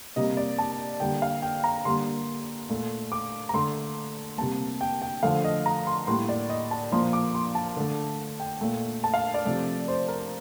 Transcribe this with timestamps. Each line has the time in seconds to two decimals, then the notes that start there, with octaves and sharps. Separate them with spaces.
0.16 C3 G3 A#3 D#5
0.37 D5
0.58 A5
1.00 D3 G3 A#3 G5
1.22 F5
1.42 G5
1.64 A#5
1.85 D3 G3 A#3 C6
2.69 A#2 A3
3.12 D6
3.49 A#5
3.54 D3 A3 C6
4.38 C3 G3 A#3 A5
4.81 G5
5.02 G5
5.23 D3 F3 A3 F5
5.44 D#5
5.66 A#5
5.87 C6
6.07 A2 G3 A#3 C6
6.29 D5
6.49 D#5
6.71 A5
6.91 A#2 F3 A#3 C6
7.13 D6
7.34 C6
7.55 A5
7.76 D3 A3
8.40 G5
8.61 A#2 A3
9.04 A5
9.14 F5
9.34 D5
9.45 C3 F3 A3
9.88 C5
10.08 A#4